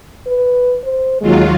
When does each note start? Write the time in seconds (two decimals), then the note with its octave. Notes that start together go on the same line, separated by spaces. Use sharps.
0.27 B4
0.84 C5
1.21 D#2 F#3 G#3 F4